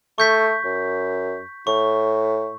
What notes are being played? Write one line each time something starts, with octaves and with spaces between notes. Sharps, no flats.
A3 C#6 G6 B6
F#2
A2 C#6